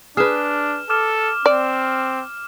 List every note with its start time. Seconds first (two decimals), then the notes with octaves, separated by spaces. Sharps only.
0.17 D4 G#4 B4 F6 E7
0.90 A4 D6 F6 E7
1.46 C4 D5